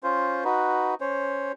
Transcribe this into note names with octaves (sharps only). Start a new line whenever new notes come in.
C#4 F4 C5
D#4 F#4 B4
C#4 C5 C#5